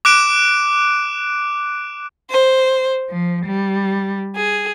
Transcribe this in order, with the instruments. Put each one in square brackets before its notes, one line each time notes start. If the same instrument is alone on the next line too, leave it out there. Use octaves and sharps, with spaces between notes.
[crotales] D6 F#6 D7 E7
[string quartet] C5
F3
G3
G#4